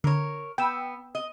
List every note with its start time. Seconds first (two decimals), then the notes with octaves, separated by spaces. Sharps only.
0.04 D3 A#4 C#5
0.58 B3 G5 E6
1.15 D#5